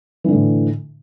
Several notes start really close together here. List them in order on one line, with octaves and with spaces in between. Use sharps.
E3 D3 A2